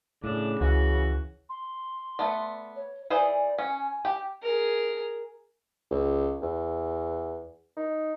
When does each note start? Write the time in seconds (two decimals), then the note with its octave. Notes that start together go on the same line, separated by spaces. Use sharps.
0.24 A2 C#3 D4
0.61 C#2 E3 F#4
1.50 C6
2.19 A3 B3 D5
2.76 C#5
3.10 E3 G#4 C5 D5
3.58 C#4 G#5
4.05 G4
4.43 G#4 A#4
5.91 C#2
6.42 E2
7.77 D#4